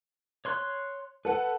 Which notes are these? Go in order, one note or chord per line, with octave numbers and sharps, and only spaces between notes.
C#5 C6 F#6
A4 B4 F#5